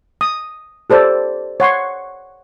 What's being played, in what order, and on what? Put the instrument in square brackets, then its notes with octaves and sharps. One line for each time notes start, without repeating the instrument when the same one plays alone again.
[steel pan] D#6
G4 A4 C5 D5
C#5 F#5 C6 C#6